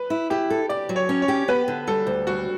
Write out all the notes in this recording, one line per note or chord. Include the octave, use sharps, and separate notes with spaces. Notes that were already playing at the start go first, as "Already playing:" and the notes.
Already playing: B4
E4
E4 G4
A4
G4 D5
F#3
C#5
C#4
C#5
G4
B3 B4
D3
G3 A4
D2
G3 F#4